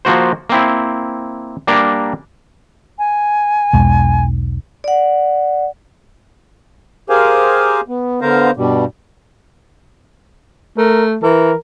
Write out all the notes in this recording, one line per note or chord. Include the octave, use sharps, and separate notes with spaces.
F3 A#3 F#4 C5
A#3 C4 E4
G3 A#3 D4 A#4
G#5
B1 E2 G#3
D5 F#5
G4 G#4 A#4 C5 F5 G#5
B3
D3 B3 A#4 C5 F5 A#5
G2 B2 G3
A3 A#4
E3 A#4